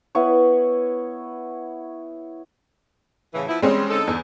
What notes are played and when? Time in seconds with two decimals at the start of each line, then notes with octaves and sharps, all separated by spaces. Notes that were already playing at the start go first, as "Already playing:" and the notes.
0.15 B3 E4 C#5
3.34 A2 C#3 E3
3.49 F3 B3 E4
3.62 E2 G3 G#3 C4 C#4
3.90 D3 D#4 A4
4.07 E2